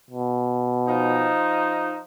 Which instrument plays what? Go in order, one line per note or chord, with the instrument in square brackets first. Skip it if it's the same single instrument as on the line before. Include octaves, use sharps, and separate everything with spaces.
[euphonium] B2
[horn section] F3 D#4